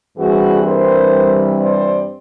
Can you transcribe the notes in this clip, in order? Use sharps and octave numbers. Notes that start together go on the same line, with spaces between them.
G2 E3 G3 C4 F#4 G#4
A#4 C5
C5 D5